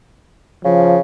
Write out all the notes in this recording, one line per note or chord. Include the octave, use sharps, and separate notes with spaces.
C#3 F3